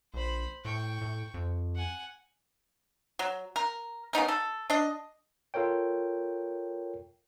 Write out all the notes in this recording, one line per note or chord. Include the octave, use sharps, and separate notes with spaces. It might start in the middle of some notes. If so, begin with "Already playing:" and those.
A#1 C5 B5
A2 G5 C#6
A2
F2
F#5 G#5
F#3
A#4
C#3 B3 D#4 A#4
A4
D4 D#5
F4 A4 A#4 C#5 G5